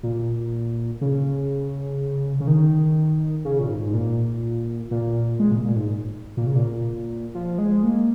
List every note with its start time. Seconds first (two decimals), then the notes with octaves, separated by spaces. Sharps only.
0.03 A#2
1.01 C#3
2.40 C#3
2.47 D#3
3.45 C#3
3.59 A#2
3.69 G#2
3.86 G#2
3.94 A#2
4.91 A#2
5.40 G#3
5.51 A#2
5.64 A#2
5.76 G#2
6.37 A#2
6.47 C#3
6.56 A#2
7.35 F3
7.58 G#3
7.83 A#3